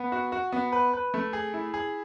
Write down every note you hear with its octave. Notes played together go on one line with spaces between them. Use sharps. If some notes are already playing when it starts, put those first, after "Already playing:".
Already playing: B3
F#4
F#4
B3
B4
B4
A3
G#4
E4
G#4